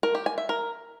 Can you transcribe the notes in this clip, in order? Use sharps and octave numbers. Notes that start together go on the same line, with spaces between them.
A#4
G4
G#5
E5
A#4